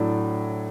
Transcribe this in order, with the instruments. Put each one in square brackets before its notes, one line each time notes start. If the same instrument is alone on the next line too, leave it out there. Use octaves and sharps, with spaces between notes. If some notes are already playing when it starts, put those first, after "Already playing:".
Already playing: [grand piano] A2 F#3 A3 D4